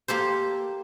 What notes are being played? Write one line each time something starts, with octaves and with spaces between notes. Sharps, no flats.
A#3 G4 A4 C5